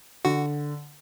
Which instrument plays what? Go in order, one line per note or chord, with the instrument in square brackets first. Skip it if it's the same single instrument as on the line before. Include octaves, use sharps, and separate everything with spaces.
[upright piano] D3 [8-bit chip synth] F#4